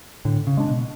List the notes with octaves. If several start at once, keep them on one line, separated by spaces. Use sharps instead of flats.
A2 D3
C#3
G#3 D4
B2